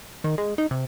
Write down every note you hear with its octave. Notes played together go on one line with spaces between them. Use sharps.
D#3
G#3
D#4
C3